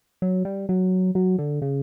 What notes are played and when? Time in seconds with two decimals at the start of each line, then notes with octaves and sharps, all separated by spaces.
0.22 F#3
0.45 G3
0.69 F#3
1.15 F#3
1.39 D3
1.62 C#3